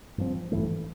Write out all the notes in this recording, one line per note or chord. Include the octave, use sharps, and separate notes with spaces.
G2 F3 C4
A1 G2 E3 A3